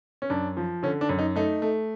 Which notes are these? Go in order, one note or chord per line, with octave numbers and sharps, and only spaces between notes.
C#4
F#2 D4
F3
D3 C#4
D4
F#2
D#4
A3 D#4
A3